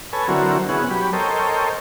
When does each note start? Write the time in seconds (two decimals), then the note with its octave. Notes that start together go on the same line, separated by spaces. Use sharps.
0.13 A4 B4 C#5 G#5
0.28 D3 F#3 C4 E4 F#4 A#4
0.69 B2 C#4 E4 G#4 F#5
0.90 F#3 G4 B5
1.13 A4 A#4 C5 C#5 D#5 G5